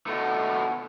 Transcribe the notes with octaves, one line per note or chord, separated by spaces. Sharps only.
B2 A3